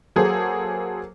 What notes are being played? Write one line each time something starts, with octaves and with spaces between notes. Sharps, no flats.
F#3 A#3 G#4 A4 C5